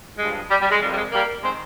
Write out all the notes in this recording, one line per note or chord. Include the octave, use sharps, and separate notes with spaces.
G2 F3 G#3
G3
G3
G#3
F2 C3 D#3 G3
G3
G#3
G3 A#3
D#3 G#3 C4